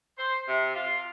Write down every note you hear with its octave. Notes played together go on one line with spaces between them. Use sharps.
C5
C3
F4